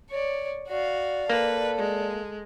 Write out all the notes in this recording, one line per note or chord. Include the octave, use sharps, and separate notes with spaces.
C#5 D5
F#4 D5 F5
A#3 A4 B4
G#3